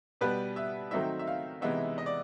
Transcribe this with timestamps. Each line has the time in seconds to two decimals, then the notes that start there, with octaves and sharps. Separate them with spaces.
0.21 B2 G3 B3 B4
0.56 E5
0.91 D#3 F#3 A3 C4 D#4 E5
1.19 E5
1.27 F5
1.61 C3 E3 G#3 B3 D#4 E5
1.98 D#5
2.06 D5